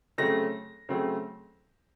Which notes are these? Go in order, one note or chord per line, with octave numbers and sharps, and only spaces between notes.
C#3 F#3 A3 C4 A#6
C#3 F#3 A3 C4